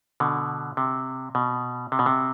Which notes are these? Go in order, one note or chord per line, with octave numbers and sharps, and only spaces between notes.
B2 D3
C3
B2
C3
B2
C3